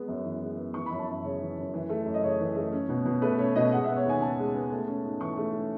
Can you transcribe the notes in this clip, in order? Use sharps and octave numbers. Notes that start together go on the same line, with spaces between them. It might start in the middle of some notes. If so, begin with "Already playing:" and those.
Already playing: G#3 B3
F#2
E3
G#3
B3
E3 C#6
F#2 B5
A5
F#2 E5
C#3 C#5
E3
F#2
E3
A3
F#2
D#5
C#3 C#5
E3
A3
C#4
B2
B2
A3 B4
C#4 C#5
B2 D#5
G#3 F#5
B3 E5
C#5
D#2 G#5
C#3 A5
G#3
B3
A3
C#4
G#2
E3 C#6
A3
C#4